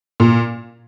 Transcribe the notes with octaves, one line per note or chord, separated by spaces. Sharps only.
A#2